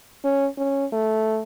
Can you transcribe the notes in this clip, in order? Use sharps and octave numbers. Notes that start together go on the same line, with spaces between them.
C#4
C#4
A3